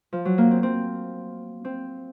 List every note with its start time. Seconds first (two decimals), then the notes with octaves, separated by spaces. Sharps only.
0.13 F3
0.25 F#3
0.38 A#3
0.51 C4
0.63 C4
1.65 C4